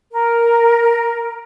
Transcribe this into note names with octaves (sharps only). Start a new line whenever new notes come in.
A#4